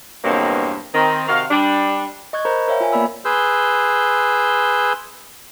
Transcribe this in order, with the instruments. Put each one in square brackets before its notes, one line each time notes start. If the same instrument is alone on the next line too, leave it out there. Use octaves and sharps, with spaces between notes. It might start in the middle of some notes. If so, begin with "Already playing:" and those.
[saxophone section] E2 G2 B2 F#3 A#3 C4
D#3 C4
C3 D#3 F#4 F5
G3 D4
[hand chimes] D#5 C#6 F#6 G#6
A#4 C5 A#5 B5 G6
A#4 C#5 E5 F5 G5
F4 G#5
A#3 B3 D5 B5 E6
[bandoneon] G#4 B4 C6 E6 G6